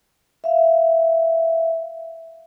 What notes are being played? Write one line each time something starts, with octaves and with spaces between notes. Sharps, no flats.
E5 F5